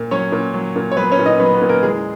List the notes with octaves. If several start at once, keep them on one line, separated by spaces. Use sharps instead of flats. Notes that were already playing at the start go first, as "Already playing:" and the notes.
Already playing: A#2
F#3 C#4 C#5
A#2
F#3
A#2
C#5
F#3 B3 B4
C#4 C#5
A#2
D#4 D#5
F#3 B3 B4
B3 B4
A#2
A#3 A#4
E2 G#3 G#4